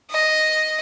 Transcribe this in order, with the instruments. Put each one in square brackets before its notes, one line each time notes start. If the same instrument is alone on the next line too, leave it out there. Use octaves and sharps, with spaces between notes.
[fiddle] D#5